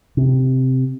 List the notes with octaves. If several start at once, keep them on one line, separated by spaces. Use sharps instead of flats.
C3